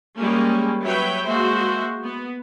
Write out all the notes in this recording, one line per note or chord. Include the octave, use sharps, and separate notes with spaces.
G3 G#3 A#3 C#4
F#3 B4 C#5 E5 G5
G#3 A#3 F#4 C5 E5
B3